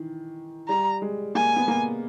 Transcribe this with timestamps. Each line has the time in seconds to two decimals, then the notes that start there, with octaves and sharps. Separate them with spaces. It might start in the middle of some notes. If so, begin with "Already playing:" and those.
Already playing: D#3 E3
0.68 G3 A#5
1.02 G#3
1.35 A#3 G#5
1.56 B3
1.68 A#3